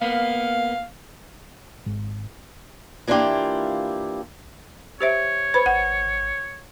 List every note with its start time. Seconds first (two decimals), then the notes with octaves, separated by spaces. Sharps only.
0.02 A#3 B3 F5
1.86 G#1
3.07 E3 A#3 D4 E4 F4 G4
5.01 G4 C5 C#5 E5
5.54 B4 C5 B5
5.66 G#1 F#5